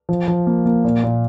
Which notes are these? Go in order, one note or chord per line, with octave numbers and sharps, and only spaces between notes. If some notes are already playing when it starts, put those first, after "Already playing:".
F3
F3
A#3
A#3
A#2
A#2